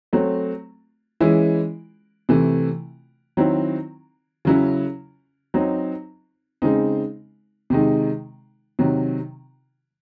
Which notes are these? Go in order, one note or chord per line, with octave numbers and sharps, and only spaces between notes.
F#3 A3 C4
E3 G#3 C#4 E4
C3 E3 A3
D#3 F#3 C4 E4
C#3 F#3 C#4 E4
F#3 C4 D#4
C#3 G#3 C4 D#4
C3 D#3 G#3 D#4
C3 D#3 F#3